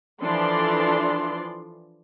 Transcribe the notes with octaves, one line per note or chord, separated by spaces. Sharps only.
E3 F3 D4 A4 D5 C6